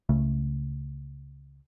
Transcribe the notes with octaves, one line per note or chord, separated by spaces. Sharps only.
C#2 C#3 A3